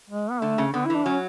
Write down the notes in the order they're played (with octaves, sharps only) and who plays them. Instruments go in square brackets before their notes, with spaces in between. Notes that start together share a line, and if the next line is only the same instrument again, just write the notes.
[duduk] G#3
B3
[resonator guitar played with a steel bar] D3 [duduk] A3
[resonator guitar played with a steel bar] C#3
[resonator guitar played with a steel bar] D3 [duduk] B3
[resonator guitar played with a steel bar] E3 [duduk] E4
[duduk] D4
[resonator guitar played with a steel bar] F#3 [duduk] C#4